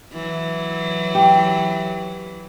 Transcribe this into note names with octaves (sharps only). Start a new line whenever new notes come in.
E3 F#3
G4